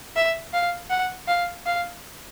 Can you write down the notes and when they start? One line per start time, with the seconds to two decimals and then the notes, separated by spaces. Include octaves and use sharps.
0.16 E5
0.53 F5
0.90 F#5
1.27 F5
1.66 F5